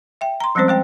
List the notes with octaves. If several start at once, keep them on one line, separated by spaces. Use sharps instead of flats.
E5 G5
A#5 C6
F3 G3 G#3 C4 C#4 C5
G#3 C5 G5